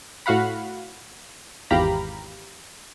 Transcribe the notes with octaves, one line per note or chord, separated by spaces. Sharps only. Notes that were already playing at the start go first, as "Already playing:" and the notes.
A2 F#4 F5 F#5 B5
G#1 E2 G4 F5 A#5 B5